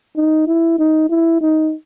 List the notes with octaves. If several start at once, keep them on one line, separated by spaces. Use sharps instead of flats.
D#4
E4
D#4
E4
D#4